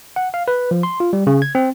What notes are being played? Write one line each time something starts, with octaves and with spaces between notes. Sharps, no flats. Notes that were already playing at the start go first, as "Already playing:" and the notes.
F#5
F5
B4
F3
C6
F4
G3
C#3
G#6
C4